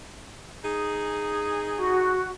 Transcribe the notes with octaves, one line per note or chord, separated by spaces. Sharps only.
D#4 G#4
F#4